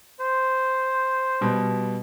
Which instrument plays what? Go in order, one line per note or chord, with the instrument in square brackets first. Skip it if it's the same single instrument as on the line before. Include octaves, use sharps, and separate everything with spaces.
[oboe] C5
[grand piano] B2 G3